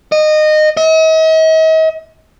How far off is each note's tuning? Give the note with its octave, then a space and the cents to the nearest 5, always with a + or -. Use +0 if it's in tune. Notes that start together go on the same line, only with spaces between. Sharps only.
D#5 -20
D#5 +45